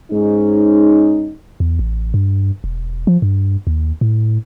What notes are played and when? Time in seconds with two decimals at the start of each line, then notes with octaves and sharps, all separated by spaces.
0.11 G#2 C#4 D#4
1.60 E2
1.79 A1
2.14 G2
2.64 E1
3.07 F3
3.22 G2
3.67 D#2
4.01 A2